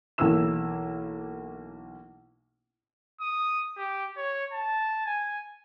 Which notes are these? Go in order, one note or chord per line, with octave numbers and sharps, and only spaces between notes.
B1 E3 A#3 E4 E6 E7
D#6
G4
C#5
A5
G#5